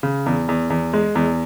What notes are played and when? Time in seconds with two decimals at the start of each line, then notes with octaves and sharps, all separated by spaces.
0.03 C#3
0.26 E2
0.49 E2
0.70 E2
0.93 G#3
1.15 E2